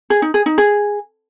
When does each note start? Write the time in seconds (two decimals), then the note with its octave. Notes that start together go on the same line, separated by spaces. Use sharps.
0.10 G#4
0.22 D#4
0.34 G#4
0.46 D#4
0.58 G#4